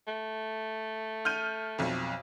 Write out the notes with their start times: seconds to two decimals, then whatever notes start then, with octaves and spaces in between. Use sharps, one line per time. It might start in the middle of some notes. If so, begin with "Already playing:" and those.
0.07 A3
1.25 F6 G6 D#7
1.78 B1 F2